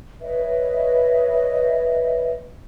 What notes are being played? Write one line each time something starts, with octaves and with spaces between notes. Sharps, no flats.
B4 C#5 D#5 E5